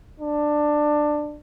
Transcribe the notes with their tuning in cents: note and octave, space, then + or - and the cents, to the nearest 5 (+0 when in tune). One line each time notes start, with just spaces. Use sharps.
D4 +15